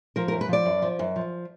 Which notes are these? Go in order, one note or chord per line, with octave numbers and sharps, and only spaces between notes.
F3 A#4
A#4
F#2
B4
F3 D5
F#2
F3
F#2
F3